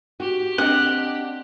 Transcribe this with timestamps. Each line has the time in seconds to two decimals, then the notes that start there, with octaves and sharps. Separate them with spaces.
0.20 F#4 G4
0.58 C4 D4 D#5 F#5